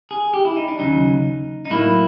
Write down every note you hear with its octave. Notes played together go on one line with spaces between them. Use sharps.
G#4
G4
E4
D#4
D4
D#2 C#3 F#3 D#4
D#4
A2 F#3 A#3 E4